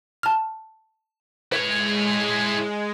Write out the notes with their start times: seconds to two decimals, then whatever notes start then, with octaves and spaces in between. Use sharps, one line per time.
0.23 A5 F6
1.52 G#3 E4 B4 C#5